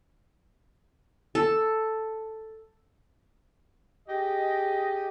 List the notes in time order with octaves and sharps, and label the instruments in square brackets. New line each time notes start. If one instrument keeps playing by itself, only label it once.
[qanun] A4
[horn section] G4 G#4 D#5